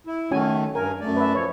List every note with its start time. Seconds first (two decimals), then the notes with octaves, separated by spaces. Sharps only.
0.07 E4
0.31 D#3 A3 C#4 F#4 G#5
0.75 G2 A#4 G#5
1.01 F#2 A3 D5
1.17 B4 E5
1.35 F3 C#5